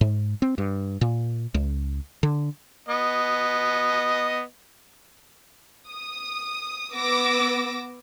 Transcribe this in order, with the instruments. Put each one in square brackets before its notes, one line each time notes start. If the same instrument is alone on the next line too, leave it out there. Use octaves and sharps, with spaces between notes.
[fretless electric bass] G#2
C4
G2
A#2
C#2
D3
[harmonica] B3 D#5
[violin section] D#6
B3 D6 E6 A#6